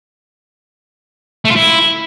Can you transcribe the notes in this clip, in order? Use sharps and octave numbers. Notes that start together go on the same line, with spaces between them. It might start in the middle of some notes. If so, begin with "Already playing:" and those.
A3
F4
E4